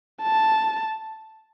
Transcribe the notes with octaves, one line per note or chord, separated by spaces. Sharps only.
A5